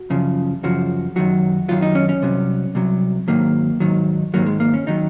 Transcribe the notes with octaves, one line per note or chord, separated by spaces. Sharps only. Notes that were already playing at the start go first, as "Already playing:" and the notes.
Already playing: F#4
F#2 C#3 F3
F#2 C#3 F3 F#4
F#2 D#3 F#3 F#4
F#2 D#3 F#3 F4
D#4
C#4
C#4
C2 C3 F#3
C2 C3 F#3
G#2 D#3 F#3 A#3
G#2 D#3 F#3
G#2 D#3 F#3 A#3
G#3
A#3
C#4
D#3 F#3 D#4